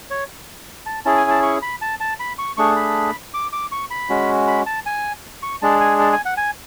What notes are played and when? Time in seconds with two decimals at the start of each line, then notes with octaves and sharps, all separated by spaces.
0.11 C#5
0.86 A5
1.05 C#4 E4 G#4 A5
1.18 G#5
1.30 A5
1.43 C#6
1.62 B5
1.82 A5
2.00 A5
2.20 B5
2.39 C#6
2.57 A3 D4 G#4 C#6
2.76 B5
3.34 D6
3.53 D6
3.72 C#6
3.91 B5
4.10 G#3 C#4 F#4
4.47 B5
4.66 A5
4.86 G#5
5.43 C#6
5.62 G#3 D4 G#4 A5
5.80 G#5
6.00 A5
6.12 G#5
6.25 F#5
6.37 G#5